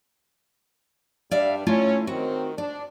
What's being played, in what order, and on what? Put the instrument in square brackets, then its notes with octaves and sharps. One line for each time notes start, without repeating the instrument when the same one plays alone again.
[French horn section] G2 G3 D4 [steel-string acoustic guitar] D5 E5 F5
[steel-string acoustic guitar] A3 E4 F4 [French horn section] C#4
[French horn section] D#3 C4 [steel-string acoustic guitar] F#4
[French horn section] D4 [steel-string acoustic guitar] D5